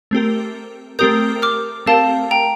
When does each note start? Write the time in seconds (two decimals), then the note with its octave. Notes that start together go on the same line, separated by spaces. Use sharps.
0.11 A3 C4 G4 A#4
0.99 A3 C4 G4 A#4 D#6 G6
1.42 D6 F6
1.86 A3 C4 G4 A#4 F5 A5
2.31 G5 A#5